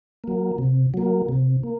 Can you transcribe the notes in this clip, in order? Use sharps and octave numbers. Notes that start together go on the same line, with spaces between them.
F#3 A#3
C3
F#3 A#3
C3
A#3